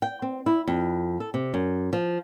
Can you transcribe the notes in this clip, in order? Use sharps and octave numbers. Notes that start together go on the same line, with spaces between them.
G5
C4
E4
F2
A4
C3
F#2
F3